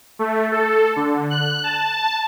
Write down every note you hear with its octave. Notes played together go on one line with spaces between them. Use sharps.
A3
A4
D3
F#6
A5